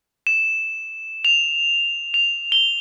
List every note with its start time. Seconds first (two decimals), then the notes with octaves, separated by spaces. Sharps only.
0.27 E7
1.25 F7
2.14 F7
2.52 G7